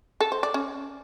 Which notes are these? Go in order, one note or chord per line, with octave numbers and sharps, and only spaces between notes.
A4
C5
D5
C#4